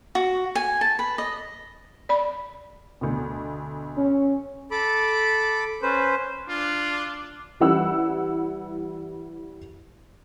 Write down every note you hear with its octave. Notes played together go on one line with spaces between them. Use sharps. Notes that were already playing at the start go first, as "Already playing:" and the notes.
F#4
G#5
A5
B4
D#5
D5 B5
D2 B2
C#4
A4 B5 D6
C#4 B4 C5
D4 F4
E3 G3 E4 F#5 E6